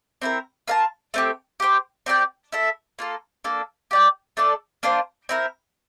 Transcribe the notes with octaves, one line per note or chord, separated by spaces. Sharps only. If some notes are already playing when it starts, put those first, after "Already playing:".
C4 E4 A#4
F4 A#4 F5 A5
A3 C4 G4
G4 C5 G5
C4 G4 D5 G5
E4 A4 E5
A#3 F4 A4
A#3 D4 A4
G4 D5 G5
A3 D4 A4 D5
A#3 D4 F4 C5
C4 E4 A#4